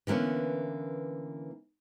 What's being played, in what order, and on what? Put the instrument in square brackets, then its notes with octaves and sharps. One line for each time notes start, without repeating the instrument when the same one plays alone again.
[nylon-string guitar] D3 E3 A#3 B3 C#4